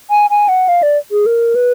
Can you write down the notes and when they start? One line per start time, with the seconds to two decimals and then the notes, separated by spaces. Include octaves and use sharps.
0.10 G#5
0.30 G#5
0.48 F#5
0.68 F5
0.83 D5
1.11 G#4
1.26 A#4
1.55 B4